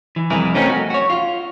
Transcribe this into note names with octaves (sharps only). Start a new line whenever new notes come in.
E3
C2 F2 E3 E4 G#4 A#4
A3 C4 C#4 D#4 F#4 A#4
F#4
F#4 C#5
F4